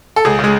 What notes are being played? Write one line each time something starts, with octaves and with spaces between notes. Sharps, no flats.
A4
C#2 G#4
C#3 G#3